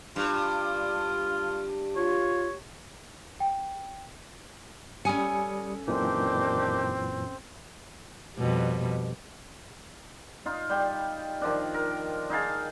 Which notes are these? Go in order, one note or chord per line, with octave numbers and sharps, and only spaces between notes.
G2 F4
F4 C#5
G5
G3 C#4 A4 G#5 D#6 C#7
F#2 A#2 D#3 E3 C4 D4 G4
F2 B2 G3
D#4 F4
G3 G5
D#3 F3 D4
A#4
D#4 G#4 F5 A5